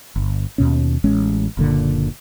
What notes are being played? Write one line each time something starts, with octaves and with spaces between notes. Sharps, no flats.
G1
D#2 B2 C#4
A1 G#3 C#4
F#1 A#2 D3